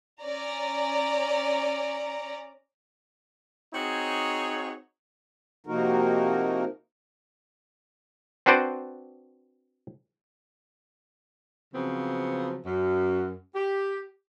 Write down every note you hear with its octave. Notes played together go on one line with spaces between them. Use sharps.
C#4 D5 A#5
C4 D#4 F#4 G#4 C#5
C3 F3 A#3 D#4 F#4 A#4
C4 D4 F#4 B4 C5 D5
C#3 F3 F#3 B3 C4
F#2
G4